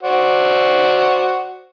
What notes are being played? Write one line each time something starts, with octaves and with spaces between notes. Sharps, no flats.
F#4 C5 D5